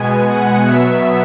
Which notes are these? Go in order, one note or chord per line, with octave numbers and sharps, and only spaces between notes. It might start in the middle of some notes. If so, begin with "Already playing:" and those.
Already playing: B2 G#3 B3 G#5
F#5
B2 F#3 B3 E5